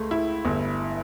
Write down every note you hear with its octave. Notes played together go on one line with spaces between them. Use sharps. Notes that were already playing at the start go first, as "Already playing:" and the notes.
Already playing: C#2 A3
E4
G1